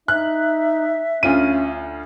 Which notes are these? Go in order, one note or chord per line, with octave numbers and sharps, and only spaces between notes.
D#4 E5 F#6
D2 C#4 F4 D#7